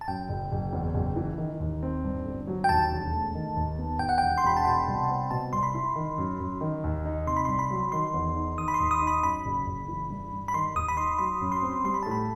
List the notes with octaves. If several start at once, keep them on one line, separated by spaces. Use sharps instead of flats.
A5
F#2 G5
F#1
F#1
E2
F#1
E3
D#3
D#2
C4
G2
G1
F#3
G5
D#2 A5
E1
A3
D#3
D#2
B3
D#2 G5
F#5
E1 G5
C6
E1 B5
A5
B2 G5
C2
C4
B2 A5
C2 C6
B5
E4
D#3
F#2
F#2
D#3
D#2
D#4
C3 C6
B5
C6
C2
B5
F#3
D#3 C6
E2
D#4
D#3 D#6
B5
C6
D#2
D#6
D#4
B5
F#2 B5
F#1
F#1
E3
G2
G2
B5
D#3 C6
D#2 D#6
B5
D#4 C6
F#3 B5
F#2
C6
C4
G3 C6
B5
A2 A5
B5